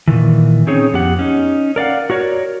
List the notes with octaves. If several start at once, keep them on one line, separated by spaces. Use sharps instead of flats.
A#2 D#3 E3
C4 C#4 D#4 G#4 C#5
F2 B3 G4 F#5
C#4 D#4
A#4 D5 F5 F#5
F#4 A#4 C#5 D5